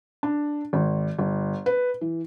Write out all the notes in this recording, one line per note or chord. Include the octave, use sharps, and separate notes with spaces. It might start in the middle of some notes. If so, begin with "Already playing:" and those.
D4
G#1
G1
B4
E3